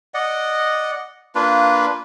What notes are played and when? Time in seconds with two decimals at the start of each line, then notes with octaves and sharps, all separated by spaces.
0.14 D5 D#5 F#5
1.35 A#3 D4 F4 B4